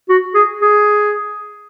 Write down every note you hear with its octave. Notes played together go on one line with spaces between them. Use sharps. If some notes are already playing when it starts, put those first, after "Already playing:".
F#4
G#4
G#4